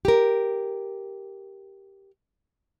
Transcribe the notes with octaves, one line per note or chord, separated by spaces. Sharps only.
G4 A#4